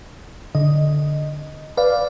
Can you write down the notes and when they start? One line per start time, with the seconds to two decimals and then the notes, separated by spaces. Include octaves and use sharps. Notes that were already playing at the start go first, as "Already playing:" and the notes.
0.55 D3 D#5
1.77 B4 D5 F5